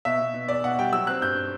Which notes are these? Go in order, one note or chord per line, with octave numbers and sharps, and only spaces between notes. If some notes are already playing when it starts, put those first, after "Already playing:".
B2 E5
B2
B2
E2 D5
B2 F#5
G3 G5
F#3 E6
C4 F#6
G2 G6